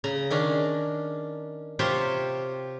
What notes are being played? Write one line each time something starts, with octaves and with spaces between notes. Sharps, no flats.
C#3 A#5
D#3 C#4 D4
C3 F4 G4 C5 C#5